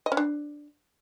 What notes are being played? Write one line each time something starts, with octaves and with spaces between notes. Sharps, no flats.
D#5
C#4
D4